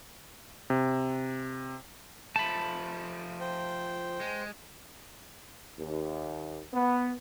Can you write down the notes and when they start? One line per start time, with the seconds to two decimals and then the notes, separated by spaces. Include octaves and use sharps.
0.70 C3
2.36 F3 A3 A5 B5
3.41 C5 G5
4.20 G#3
5.78 D#2
6.73 B3